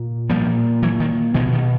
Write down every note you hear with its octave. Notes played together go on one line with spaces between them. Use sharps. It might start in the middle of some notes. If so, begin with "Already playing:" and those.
Already playing: A#2
A#2 F3 G3
E3 F#3
D#3
B2 D#3 F3
D#3